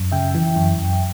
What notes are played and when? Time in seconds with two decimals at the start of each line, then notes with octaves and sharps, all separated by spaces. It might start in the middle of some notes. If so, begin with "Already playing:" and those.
Already playing: F#2
0.12 C#3 E5 G5
0.35 E3
0.56 F#2
0.78 F#2